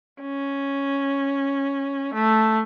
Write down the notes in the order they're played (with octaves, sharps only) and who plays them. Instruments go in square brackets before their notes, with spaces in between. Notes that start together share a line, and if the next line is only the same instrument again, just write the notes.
[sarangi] C#4
A3